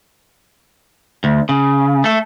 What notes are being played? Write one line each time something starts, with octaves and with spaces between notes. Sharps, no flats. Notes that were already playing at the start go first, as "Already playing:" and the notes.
D2
C#3
A3 A4